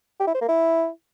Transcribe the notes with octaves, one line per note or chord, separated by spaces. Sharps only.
G4
E4
C5
A#3
E4